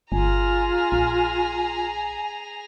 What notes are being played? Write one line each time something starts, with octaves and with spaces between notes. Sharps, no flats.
G1 F4 G#4 G#5 A#5
A#1